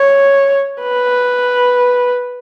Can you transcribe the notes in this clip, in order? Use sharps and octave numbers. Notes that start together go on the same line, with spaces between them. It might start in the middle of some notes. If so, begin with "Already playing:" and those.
Already playing: C#5
B4